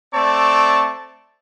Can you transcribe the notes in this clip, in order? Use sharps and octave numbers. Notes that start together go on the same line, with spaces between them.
A3 C4 D5 A5 C#6